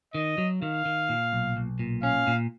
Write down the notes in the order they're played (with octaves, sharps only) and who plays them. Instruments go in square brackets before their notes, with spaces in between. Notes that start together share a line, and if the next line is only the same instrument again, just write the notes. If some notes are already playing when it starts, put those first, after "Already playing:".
[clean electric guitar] D#3 [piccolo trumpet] D#5
[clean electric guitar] F#3
[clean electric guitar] D#3 [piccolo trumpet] F5
[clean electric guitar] D#3
A#2
B1
B1
A#2
[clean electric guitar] C#4 [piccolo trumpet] F5
[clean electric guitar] A#2